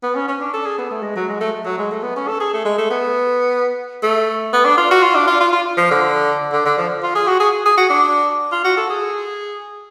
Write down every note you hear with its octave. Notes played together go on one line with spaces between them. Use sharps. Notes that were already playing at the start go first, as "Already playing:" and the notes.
B3
C#4
C#4
D4
A4
G#4
B3
A3
G#3
F#3
G#3
A3
F#3
G#3
A3
B3
C#4
A4
G#4
A3
G#3
A3
B3
A3
B3
D4
F4
F#4
F4
D4
F4
F4
F4
F3
D3
D3
D3
F3
F4
G#4
F#4
G#4
G#4
F#4
D4
F4
F#4
A4
G#4